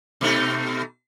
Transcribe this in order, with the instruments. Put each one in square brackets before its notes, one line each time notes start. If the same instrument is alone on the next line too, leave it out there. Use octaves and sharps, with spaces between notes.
[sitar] B2 A3 D#4